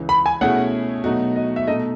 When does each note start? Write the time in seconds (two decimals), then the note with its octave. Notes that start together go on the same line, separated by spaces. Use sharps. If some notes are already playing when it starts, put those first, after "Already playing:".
Already playing: C#2 C#3 E3
0.09 B5
0.26 G#5
0.41 B2 A3 C#4 E4 G#4 F#5
1.04 B2 F#3 A3 D#4 F#4
1.36 D#5
1.56 E5
1.67 B2 A3 D#4 A4 D#5